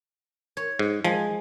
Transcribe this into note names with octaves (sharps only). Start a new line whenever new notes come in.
C#5
G#2
F3 G#3